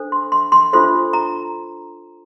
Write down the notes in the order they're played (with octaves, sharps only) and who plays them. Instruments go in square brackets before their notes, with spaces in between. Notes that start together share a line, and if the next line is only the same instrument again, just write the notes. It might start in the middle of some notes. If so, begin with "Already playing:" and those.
Already playing: [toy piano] D4 A4 C5
C6
C6
C6
D4 F4 A4 C5 C6
A#5